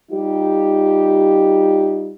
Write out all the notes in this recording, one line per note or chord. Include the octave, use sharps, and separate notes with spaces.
G3 D#4 F4 G4